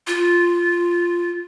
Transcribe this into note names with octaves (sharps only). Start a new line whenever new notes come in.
F4